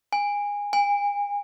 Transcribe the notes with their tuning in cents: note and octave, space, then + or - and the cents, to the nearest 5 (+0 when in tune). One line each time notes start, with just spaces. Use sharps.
G#5 -20
G#5 -35